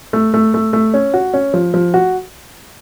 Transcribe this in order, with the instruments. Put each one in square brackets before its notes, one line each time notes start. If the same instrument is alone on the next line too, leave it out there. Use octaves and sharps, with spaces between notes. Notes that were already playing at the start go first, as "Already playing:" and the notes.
[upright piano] A3
A3
A3
A3
C#4
F#4
C#4
F3
F3
F#4